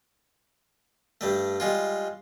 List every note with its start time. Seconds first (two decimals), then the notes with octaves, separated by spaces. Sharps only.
1.21 G2 G3 A3
1.60 G3 G#3 F4